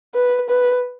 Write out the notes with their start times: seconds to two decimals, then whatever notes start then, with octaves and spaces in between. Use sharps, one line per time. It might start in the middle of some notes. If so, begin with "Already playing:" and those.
0.14 B4
0.49 B4